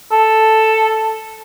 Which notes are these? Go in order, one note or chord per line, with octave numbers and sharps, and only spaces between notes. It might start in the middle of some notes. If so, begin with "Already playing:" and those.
A4